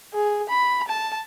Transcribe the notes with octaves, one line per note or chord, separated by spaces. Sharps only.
G#4
B5
A5